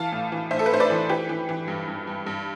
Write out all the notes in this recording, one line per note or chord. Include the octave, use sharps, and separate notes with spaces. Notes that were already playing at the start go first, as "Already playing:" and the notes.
Already playing: E3 F5 A5
A2
E3
A2 C5 E5
A4
B4
A2 C5
B4 D5
E3
E3 G4 B4
E3
E3
G2
G2
G2
G2